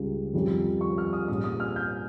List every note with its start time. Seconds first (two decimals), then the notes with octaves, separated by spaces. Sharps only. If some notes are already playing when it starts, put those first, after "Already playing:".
Already playing: C#2 C#3 G3
0.34 F2 D#3 G3 C#4
0.81 C#6
0.98 F6
1.13 D#6
1.28 A#2 G3 C#4 D#6
1.44 D#6
1.60 F6
1.76 G6